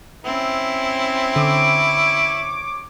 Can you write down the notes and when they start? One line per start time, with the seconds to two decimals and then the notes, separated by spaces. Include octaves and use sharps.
0.24 C4 C#4 E4
1.36 D3 C#5 D6